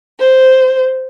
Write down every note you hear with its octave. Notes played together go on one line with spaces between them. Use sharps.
C5